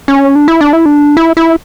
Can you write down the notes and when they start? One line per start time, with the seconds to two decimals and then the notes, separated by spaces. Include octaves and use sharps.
0.08 C#4
0.35 D4
0.48 E4
0.61 D4
0.73 E4
0.86 D4
1.17 E4
1.37 E4